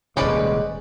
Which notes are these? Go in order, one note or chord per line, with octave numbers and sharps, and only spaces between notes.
D#1 C3 G#3 C#4 B4 D5